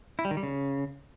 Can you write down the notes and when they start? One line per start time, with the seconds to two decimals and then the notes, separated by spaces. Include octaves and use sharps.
0.19 E4
0.25 G3
0.31 D#3
0.37 G3
0.43 C#3